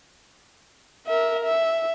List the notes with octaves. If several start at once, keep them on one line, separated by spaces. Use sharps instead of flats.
A#4 E5
E5